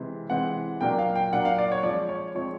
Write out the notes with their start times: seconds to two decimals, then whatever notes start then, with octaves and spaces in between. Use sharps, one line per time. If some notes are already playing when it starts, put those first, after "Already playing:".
Already playing: C3 E3 G#3 C4
0.30 C3 E3 G#3 C4 F#5
0.81 A#2 F#3 A#3 D4 G5
0.99 F5
1.15 G5
1.32 A#2 F#3 A#3 D4 F#5
1.45 F5
1.58 D5
1.72 C#5
1.83 F3 G#3 C4 D5
2.09 C#5
2.35 F3 G#3 C4 C#5